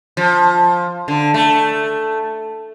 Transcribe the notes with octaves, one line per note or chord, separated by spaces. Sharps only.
F3
D3
A3